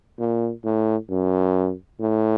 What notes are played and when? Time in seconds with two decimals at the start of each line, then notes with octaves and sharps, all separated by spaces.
0.19 A#2
0.65 A2
1.09 F#2
2.00 A2